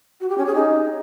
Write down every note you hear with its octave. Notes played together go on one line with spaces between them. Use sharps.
F#4
G4
C#4
G#4
D#4